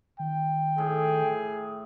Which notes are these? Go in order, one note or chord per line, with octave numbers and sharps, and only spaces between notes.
D#3 G5
A2 G#4